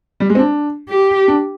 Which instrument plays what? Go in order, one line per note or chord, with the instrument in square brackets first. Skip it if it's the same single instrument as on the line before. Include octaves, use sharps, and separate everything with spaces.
[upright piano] G3
G#3
C4
D4
[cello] G4
[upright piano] D4